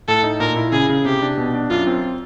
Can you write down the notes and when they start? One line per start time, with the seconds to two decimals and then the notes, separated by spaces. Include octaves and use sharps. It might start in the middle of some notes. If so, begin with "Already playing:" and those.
0.08 A2 A4
0.23 D#4
0.40 A#2 A#4
0.57 E4
0.72 C#3 G#4
0.89 C#3
1.05 C3 G4
1.22 D4
1.38 B2
1.54 D4
1.70 F#2 F4
1.87 C4